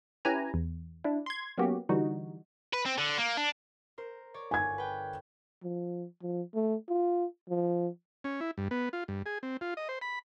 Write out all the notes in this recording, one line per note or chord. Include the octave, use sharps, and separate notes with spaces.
C#4 E4 G4 B4 G#5 A#5
E2
D4 E4
C6 G#6
F#3 A#3 B3 C#4 F#4 G4
D3 E3 G3 D#4 F#4
B4
C4
D3
A#3
D4
A#4 C5
C#5 D5
G1 G#5 G#6
B4 G5
F3
F3
A3
F4
F3
C#4
E4
G2
B3
F4
G2
G#4
C4
F4
D#5
C5
B5